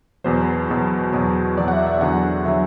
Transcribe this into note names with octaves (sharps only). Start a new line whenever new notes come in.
E2 B2 F#3 C5
E2 B2 F#3
E2 B2 F#3
E2 B2 F#3 D5
F#5
E5
E5
E2 D3 F#3 F#5
D3 F#3 E5